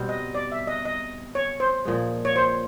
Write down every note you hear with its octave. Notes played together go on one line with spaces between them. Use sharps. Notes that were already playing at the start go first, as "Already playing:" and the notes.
Already playing: B2 G3 C4
D#5
D5
E5
D#5
D#5
C#5
C5
A#2 F3 G#3
C#5
C5